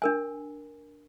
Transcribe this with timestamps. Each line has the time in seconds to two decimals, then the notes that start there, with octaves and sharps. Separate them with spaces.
0.02 D4 A#4 G#5